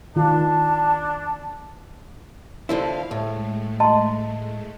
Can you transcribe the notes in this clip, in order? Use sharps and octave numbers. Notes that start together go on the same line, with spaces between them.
D#3 D4 F4 A5
D3 F3 E4 F5
A2 G#3 A3
D#5 A5 C6